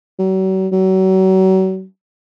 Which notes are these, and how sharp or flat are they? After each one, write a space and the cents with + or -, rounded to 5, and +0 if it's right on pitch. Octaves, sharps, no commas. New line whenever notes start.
F#3 +40
F#3 +35